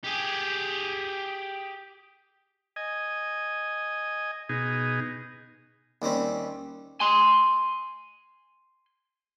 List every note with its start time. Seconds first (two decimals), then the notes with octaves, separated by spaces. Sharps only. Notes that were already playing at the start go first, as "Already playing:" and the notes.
0.04 G4 G#4
2.76 D#5 G#5
4.49 B2 D#4 G#4
6.02 D#2 G3 C4 C#4
7.00 G#5 C6